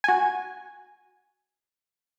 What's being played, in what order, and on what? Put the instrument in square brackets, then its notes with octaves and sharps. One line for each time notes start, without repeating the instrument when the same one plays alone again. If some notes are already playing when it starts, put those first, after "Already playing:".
[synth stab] F#4 G#5